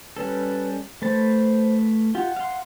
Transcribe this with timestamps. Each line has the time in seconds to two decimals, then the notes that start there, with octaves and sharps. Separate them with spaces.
0.17 G3 C#4 A4 B4
1.02 A3 B4 C5 A5
2.15 F4 G4 F#5
2.36 F5 C6